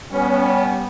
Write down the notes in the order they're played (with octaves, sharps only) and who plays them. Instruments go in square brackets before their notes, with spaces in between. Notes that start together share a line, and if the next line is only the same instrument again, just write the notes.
[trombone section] G3 B3 [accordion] C#4